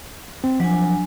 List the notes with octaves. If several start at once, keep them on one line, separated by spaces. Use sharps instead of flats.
C4
F3 F#3 D4 G#5